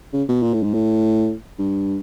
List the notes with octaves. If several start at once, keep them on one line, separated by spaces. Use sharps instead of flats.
C#3
B2
A#2
A2
G#2
A2
G2